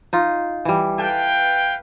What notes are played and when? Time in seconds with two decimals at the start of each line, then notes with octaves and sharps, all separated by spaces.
0.13 D#4 F4
0.65 E3 G3
0.98 A4 B4 F5 G5